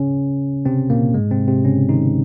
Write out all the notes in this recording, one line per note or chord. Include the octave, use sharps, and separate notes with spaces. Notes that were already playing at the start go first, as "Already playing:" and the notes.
Already playing: C#3 C#4
C3 C4
A#2 A#3
G#2 G#3
C3 C4
C3 C4
C#3 C#4
D#3 D#4